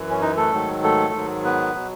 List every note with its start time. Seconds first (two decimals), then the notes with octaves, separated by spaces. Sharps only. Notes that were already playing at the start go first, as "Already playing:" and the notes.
Already playing: F#2 E3
0.10 C#4
0.21 D#4
0.37 A3 A4
0.52 G#2 D#3 F#3
0.83 A3 A4
1.13 G#2 D#3 F#3
1.44 B3 B4
1.75 B2 F#3